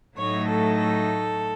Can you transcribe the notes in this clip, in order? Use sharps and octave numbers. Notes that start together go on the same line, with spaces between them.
A2 F#3 A3 D#4 C#5
A4
A4